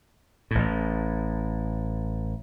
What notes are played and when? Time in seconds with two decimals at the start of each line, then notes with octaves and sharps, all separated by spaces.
0.51 A1 A2